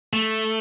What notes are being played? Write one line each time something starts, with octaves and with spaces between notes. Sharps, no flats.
A3